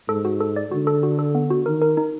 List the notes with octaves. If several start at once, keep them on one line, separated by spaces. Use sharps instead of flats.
G#2 A4
F#4
A4
D5
D3 F#4
A4
F#4
A4
B3
F#4
D#3 A#4
A#4
D#4